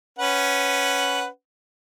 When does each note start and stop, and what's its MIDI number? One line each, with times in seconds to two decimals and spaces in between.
0.19 1.27 61
0.19 1.27 71
0.19 1.27 78